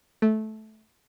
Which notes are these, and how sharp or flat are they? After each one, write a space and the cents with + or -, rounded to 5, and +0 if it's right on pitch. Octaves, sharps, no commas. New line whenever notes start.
A3 -15